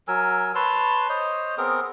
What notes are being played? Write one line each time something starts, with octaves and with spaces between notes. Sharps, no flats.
F#3 A#4 G#5 E6
B4 C#5 A5 C6
C5 C#5 D#5
B3 C4 G#4 A#4